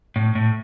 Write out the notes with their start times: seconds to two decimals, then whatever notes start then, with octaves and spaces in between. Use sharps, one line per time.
0.16 A2
0.35 A2